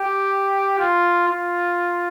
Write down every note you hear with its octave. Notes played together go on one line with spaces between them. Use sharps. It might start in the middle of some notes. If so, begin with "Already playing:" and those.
Already playing: G4
F4
F4